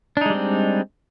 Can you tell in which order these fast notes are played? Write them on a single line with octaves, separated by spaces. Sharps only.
D4 D#4 G#3 G3 C4